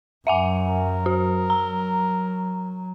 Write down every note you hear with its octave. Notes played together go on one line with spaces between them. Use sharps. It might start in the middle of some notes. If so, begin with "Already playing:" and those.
F#2 F#3 E5 F#5 G#5
A#4
F#4
F#3 A#5